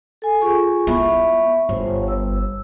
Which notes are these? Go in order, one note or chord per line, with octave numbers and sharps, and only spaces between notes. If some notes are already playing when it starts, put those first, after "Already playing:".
A4 G#5
F4 G#4 C#6
B3 E4 E5 B5 C#6
G1 C5 C#5
E6